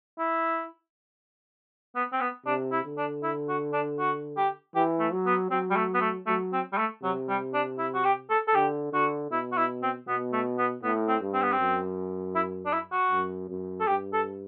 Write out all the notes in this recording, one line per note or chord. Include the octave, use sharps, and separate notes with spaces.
E4
B3
C4
B3
C3 D4
E4
D3
D4
E4
F#4
D4
F#4
G4
E3 G4
A3
F#3
B3
F#3 C4
G3
A3
B3
A3
F#3 A3
C4
G3
A3
C3 F#3
G3
D4
E4
F#4
G4
A4
A4
D3 G4
D3 F#4
B2 E4
F#4
E4
C4
B2 B3
A3
B3
A2 B3
C4
G2
C4
B3
C4
F#2
E4
D4
E4
F#4
F#2
F#2
A4
G2 G4
A4